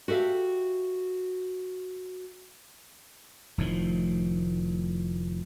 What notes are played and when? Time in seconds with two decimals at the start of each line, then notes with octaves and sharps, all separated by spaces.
0.08 F#4 G4 A4 E5 F5
3.58 F1 A2 D#3 F3